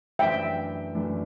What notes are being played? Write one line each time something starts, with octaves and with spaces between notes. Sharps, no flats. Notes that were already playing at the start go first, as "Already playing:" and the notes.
F#2 E3 A3 D4 E5 G5
F#2 E3 A3 D4